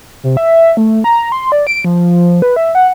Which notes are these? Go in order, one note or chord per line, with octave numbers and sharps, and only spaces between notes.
C3
E5
A3
A#5
C6
D5
D7
F3
B4
E5
F#5